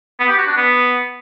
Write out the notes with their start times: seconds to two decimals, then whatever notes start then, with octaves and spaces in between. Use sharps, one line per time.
0.19 B3
0.29 G4
0.38 F#4
0.47 D4
0.56 B3